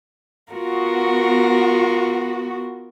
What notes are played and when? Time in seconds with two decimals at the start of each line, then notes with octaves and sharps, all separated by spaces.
0.52 B3 F4 F#4 A#4